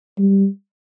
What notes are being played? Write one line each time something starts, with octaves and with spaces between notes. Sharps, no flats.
G3